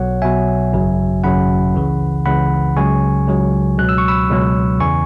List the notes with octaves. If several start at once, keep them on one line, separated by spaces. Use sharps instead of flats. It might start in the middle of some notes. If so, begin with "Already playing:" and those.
Already playing: B1 B2 F#3 C#5 F#5
B1 B2 F#3 E5 G#5
G#1 F#2 C#3 F#3
G#1 F#2 C#3 F#3 F#5 B5
C#2 C#3 E3
C#2 C#3 E3 F#5 B5
C#2 C#3 F#3 G#5 C#6
C#2 C#3 F#3
C#2 B2 F#3 F#6
E6
C#6
B5 E6
C#2 B2 F#3
E2 C#3 E3 G#5 C#6